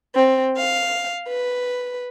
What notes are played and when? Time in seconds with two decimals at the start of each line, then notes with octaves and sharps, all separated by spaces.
0.16 C4
0.58 F5
1.28 B4